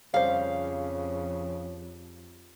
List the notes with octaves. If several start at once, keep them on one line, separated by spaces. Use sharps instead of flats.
F2 C#3 G3 C5 F5